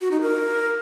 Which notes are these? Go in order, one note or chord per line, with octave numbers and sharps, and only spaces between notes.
F#4
D#4
A#4